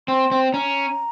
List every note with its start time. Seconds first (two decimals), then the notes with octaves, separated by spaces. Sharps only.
0.08 C4 C6
0.31 C4
0.53 C#4 A#5